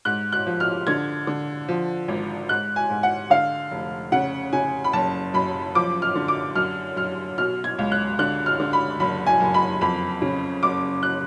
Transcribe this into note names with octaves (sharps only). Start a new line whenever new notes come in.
G#2 F#6
F#6
F3
F6
D3 G#6
D3
F3
G#1
G#2 F#6
G#5
G#2
F#5
D3 F5
F1
C#3 F#5
C#3 G#5
B5
F#1 A5
F#2 B5
F3 D6
F6
D3
D6
F#2 F6
F#2 F6
B2 F6
G#6
C#2
F#6
D3 F#6
F6
D3
B5
F#1 B5
G#5
F#1
B5
F2 B5
C#3
F#1 D6
F#6